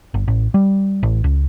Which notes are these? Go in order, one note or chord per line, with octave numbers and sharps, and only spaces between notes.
G1
A1
G3
A1
C#2